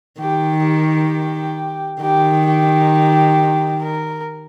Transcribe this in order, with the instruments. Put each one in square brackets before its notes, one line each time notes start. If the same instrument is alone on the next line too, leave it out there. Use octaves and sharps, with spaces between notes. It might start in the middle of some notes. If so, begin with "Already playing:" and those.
[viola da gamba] D#3 [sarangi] G4
[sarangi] G4
[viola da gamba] D#3 [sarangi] G4
[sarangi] G4
A#4